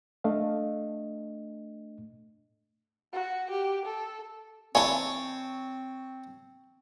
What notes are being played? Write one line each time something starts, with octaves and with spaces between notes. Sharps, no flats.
A3 D4 D#5 F5
F#4
G4
A4
E3 C4 D#4 C#5 G#5 A5